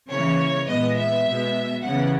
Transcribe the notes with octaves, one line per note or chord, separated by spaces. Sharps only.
C#3 E3 A#3 C#5
A#2 G#3 B3 D#5
E5
B2 G#3 B3
C#3 E3 B3 F#5